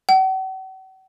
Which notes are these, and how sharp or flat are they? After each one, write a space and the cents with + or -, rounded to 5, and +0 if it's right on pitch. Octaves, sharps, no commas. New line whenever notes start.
F#5 +45